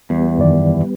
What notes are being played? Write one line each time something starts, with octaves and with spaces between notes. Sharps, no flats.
E2 G3 B3
F#2 D#3 D5